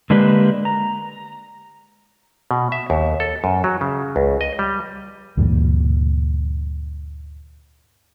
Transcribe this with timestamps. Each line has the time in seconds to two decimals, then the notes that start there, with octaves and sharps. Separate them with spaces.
0.10 D3 G#3 A#3 D4 G4 B4
0.65 A#5
2.51 B2
2.72 E5
2.90 D#2
3.20 A4
3.44 F#2
3.64 F#3
3.81 C#3
4.16 C#2
4.41 D#5
4.59 G3
5.37 D2 G2 A#2 E3